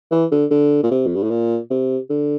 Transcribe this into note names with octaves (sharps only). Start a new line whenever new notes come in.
E3
D3
D3
A#2
C3
F2
G2
A2
A#2
C3
D3